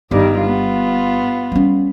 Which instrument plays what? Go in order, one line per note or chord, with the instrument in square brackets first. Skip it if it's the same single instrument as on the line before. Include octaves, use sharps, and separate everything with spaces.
[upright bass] G1 [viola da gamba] G2 D#3 G3
[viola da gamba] B3 F4
[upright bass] G3 C#4